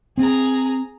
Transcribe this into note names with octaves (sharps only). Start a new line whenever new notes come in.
C4 G#4 A#5